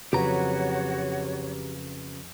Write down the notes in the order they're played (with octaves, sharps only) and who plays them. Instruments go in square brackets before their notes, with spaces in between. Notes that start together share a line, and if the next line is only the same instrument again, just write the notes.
[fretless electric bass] F2 [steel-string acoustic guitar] C#3 F#3 B4 [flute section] F#4 C#5 [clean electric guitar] G4 A#5